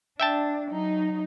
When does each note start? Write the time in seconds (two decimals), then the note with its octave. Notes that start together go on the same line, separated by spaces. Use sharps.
0.20 D4 E5 G5 A5
0.72 F#3 D#4